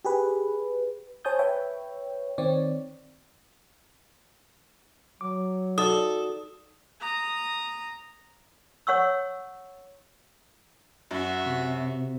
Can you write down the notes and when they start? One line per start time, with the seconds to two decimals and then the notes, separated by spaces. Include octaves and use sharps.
0.05 G4 G#4 B4
1.25 C5 C#5 G#5 A5 D#6 G6
1.39 B4 C#5 E5 G5
2.38 D#3 C4 C#5 D5
5.21 F#3 D6
5.78 D#4 F#4 A4 D5 D#6
7.00 A#5 D#6
8.87 C#5 F#5 C#6 E6
11.11 F#2 F#4 E5
11.46 C3